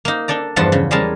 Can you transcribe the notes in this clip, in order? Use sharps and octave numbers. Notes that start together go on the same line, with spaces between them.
A#3 D#4
D4 A4 D5 A#5
E2 G2 F3 F#5 A5 C6
C#3
G3 G#3 C#4 G#4 A#4 A5